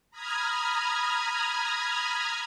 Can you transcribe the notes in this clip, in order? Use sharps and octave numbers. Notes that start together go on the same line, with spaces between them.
A#5 B5 D#6 F6 G#6